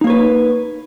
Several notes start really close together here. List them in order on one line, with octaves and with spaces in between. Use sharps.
D#4 A#3 C#5 B4